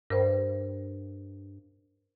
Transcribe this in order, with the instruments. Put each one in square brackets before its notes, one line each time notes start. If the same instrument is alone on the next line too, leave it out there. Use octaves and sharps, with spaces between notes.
[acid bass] G2 [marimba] A#4 C5